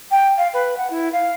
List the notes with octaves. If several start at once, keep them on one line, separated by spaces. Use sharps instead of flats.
G5
F5
B4
F#5
E4
F5